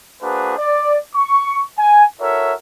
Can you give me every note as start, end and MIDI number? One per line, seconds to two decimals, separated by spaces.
0.22 0.56 58
0.22 0.56 62
0.22 0.56 66
0.22 0.56 68
0.22 0.56 71
0.22 0.56 72
0.57 0.98 74
1.15 1.62 85
1.78 2.04 80
2.20 2.53 64
2.20 2.53 66
2.20 2.53 69
2.20 2.53 70
2.20 2.53 73
2.20 2.53 76